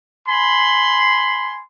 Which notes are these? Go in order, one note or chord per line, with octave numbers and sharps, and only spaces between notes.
G#5 B5 C6